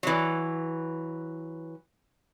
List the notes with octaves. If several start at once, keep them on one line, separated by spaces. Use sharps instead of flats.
E3 F#3